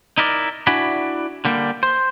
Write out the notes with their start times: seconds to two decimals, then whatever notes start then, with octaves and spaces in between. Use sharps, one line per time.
0.18 D#4 E4 A#4 D5
0.67 D4 E4 F#4 D5 G#5 B5
1.45 D3 G3 A#3
1.83 C5